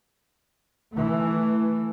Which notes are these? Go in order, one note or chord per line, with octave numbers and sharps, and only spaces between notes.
E3 A3